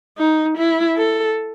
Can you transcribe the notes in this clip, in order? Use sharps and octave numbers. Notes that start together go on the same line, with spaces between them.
D#4
E4
A4